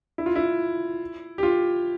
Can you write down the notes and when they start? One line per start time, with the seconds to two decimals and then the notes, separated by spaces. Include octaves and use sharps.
0.18 E4
0.26 F4
0.36 E4
1.38 G4
1.43 F4